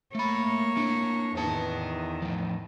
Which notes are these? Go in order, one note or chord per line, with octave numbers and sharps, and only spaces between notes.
A3 A#3 C#5 B5
C4 D4
E2 D#3 B4 A5
A2 F3